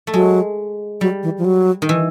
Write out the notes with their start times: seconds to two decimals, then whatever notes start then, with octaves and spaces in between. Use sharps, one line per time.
0.07 A3
0.14 F#3 G#3
1.01 F#3 G3
1.23 E3
1.38 F3
1.45 F#3
1.82 D#3
1.89 E3